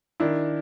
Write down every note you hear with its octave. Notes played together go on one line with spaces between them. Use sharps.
D#3 D4 E4